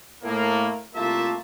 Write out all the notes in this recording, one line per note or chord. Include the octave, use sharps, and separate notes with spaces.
A2 A#3
C2 A3 A#3 F4 E5 A5